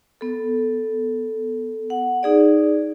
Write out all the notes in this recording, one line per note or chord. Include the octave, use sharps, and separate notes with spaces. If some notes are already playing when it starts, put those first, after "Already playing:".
B3 A4
F#5
D#4 G#4 D5